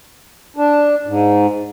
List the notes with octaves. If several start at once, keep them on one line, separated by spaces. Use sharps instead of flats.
D4
G#2